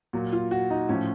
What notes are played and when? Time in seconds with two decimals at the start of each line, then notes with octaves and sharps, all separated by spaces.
0.13 A#2 F#3
0.33 F4
0.51 F#4
0.70 D#4
0.89 A2 F3 C#4